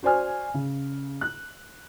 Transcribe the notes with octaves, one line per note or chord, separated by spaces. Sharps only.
F#4 C5 D5 G#5 F6
C#3
F#6